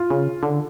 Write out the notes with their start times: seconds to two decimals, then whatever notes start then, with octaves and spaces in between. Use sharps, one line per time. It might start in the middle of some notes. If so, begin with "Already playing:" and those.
Already playing: F4
0.10 C#3
0.43 D3